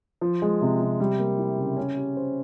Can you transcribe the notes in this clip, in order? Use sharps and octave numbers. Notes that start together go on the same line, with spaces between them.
F3
G#3
C3
C3
G3
A#3
E4
C#3
C#4
G4
C5